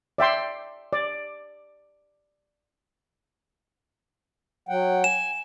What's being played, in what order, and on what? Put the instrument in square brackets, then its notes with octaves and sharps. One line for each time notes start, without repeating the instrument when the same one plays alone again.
[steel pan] D5 E5 G5 C6
D5
[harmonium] F#3 F#5 G5
[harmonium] G#5 [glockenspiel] E7